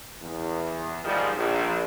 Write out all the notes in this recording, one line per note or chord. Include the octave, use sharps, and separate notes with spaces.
E2
G#2 D#3 F3 G3
A#1